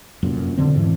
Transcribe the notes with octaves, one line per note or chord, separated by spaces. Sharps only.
F1 F#2 A#2
E1 D3 C4
G#2 E3